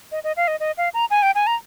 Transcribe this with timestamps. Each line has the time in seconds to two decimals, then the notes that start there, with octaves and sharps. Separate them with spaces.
0.12 D#5
0.24 D#5
0.37 F5
0.48 D#5
0.60 D#5
0.78 F5
0.94 A#5
1.10 G#5
1.23 G5
1.35 G#5
1.47 A#5